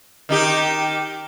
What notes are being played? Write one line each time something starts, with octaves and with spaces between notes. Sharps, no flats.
D#3 D#4 G4